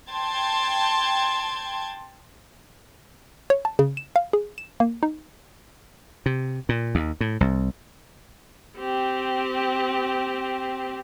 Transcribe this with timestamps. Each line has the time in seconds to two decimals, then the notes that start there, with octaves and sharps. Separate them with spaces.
0.11 G5 A5 C6 G#6
3.50 C#5
3.65 A5
3.79 C#3
3.97 E7
4.16 F5
4.33 G#4
4.58 E7
4.80 A#3
5.03 D#4
6.26 C3
6.69 A#2
6.95 D#2
7.21 A2
7.41 C2
8.78 C4 G4